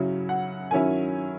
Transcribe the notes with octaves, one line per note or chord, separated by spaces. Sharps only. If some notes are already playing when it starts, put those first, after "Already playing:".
Already playing: C#3 F#3 C#4 E4
F#5
D#3 F#3 C#4 E4 G#5